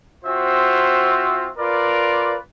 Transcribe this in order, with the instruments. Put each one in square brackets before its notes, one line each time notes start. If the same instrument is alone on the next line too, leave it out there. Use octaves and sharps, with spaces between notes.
[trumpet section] C4 F4 F#4 C5 E5
F4 A#4 B4 D5